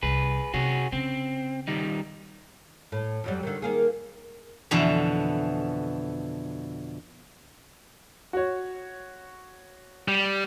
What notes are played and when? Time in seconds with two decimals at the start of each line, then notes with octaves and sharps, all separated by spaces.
0.03 C2 G#4 B4
0.54 C3 F#4 G#4 C#5
0.92 C#3 C4
1.68 D#3 G3 D#4
2.92 A2
3.24 F2 F#3 G3
3.43 D3 D#3
3.62 D#3 A#3 G#4
4.71 F2 B2 D3 E3
8.33 F#4 C#5
10.08 G3